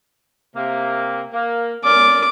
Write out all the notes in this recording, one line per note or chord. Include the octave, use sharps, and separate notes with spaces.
C3 A#3
A#3
C#4 A#4 D5 D6